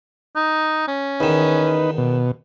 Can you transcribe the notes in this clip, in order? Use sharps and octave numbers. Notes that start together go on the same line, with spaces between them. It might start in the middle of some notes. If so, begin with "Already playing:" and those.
D#4
C#4
E2 D#3 D#4 B4
B2